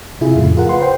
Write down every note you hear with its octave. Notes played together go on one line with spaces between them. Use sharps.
C3 E4 F4 G#4
F2 A2 C#3 A3
F4 G#4 A#4 F#5
B4 F#5 C6
C5 F#5 G5 C6